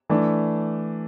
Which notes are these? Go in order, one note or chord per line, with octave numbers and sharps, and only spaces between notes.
E3 A3 D4